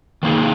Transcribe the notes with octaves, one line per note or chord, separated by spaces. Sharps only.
D#3 A#3 D#4 G#4